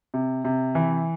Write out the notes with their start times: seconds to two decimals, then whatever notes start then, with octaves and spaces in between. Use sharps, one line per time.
0.14 C3
0.45 C3
0.75 E3